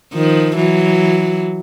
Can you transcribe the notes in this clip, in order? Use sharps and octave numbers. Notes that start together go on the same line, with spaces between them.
D#3 F3
E3 F#3